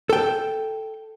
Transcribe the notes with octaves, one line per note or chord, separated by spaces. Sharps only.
A4 G5